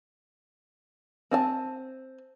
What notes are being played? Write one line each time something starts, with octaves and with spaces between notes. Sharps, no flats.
C4 G#5 A5